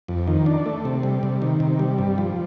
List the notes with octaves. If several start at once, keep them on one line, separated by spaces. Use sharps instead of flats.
F2
D#3
D4
A3
C3
G3
C3
D#3
C3
G3
G2
F3